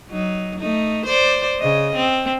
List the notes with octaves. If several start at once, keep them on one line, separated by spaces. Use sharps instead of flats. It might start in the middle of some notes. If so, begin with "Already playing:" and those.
F#3 D#4
A3 D#4
C5 D5
C#3 D#5
C4